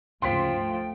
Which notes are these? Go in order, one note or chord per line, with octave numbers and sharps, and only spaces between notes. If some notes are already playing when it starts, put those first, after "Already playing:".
D2 G#2 C#3 F3 G5 C6 B6
A3